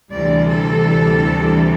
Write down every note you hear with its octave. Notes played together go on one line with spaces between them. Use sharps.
D2 C3 E3 G3 D5
A4